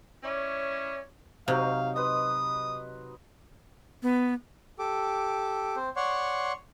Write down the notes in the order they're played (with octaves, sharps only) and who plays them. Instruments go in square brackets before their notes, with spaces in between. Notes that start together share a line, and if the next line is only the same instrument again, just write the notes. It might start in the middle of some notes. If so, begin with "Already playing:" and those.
[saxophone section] C#4 E4 C#5 D5
[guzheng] C3 [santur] F#3 D#4 [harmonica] F5
[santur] B4 C5 D#5 [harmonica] D#6
[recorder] B3
[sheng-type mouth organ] G4 A4 D6
C4 C5
C#5 D5 F#5 C6 C#6